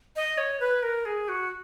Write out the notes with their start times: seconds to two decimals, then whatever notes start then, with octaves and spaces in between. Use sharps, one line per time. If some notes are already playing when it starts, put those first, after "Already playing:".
0.16 D#5
0.38 C#5
0.60 B4
0.83 A#4
1.05 G#4
1.28 F#4